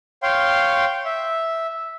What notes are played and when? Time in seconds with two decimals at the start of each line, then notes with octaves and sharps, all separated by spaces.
0.23 C#5 F5 G5 C6
1.05 E5